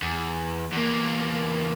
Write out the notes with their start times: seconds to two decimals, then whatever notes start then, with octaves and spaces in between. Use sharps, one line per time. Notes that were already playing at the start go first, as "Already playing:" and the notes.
0.02 E2
0.72 E2 A#3